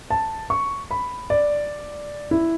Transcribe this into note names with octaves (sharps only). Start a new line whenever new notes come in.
A5
C#6
B5
D5
E4